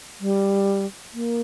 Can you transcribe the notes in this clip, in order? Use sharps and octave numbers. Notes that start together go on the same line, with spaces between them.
G3
A#3